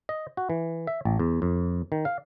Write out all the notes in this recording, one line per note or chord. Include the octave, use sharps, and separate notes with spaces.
D#5
F#4
E3
E5
A1
E2
F2
D#3
F5